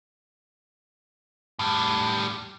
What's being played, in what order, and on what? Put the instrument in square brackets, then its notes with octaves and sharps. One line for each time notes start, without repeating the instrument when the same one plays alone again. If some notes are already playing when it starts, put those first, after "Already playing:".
[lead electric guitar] A2 G3